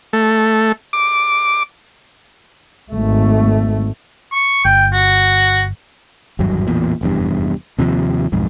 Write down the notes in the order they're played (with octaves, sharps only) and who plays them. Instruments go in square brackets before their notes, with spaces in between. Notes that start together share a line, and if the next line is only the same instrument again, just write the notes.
[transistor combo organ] A3
D6
[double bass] G#1 A3
[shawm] C#6
[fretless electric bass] G1 [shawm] G5
[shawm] F#4
[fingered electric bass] G#1 E2 G2 F#3
A1 E2 A#2
F1 E2 G2
D#2 C3 F3
B1 F2 G#2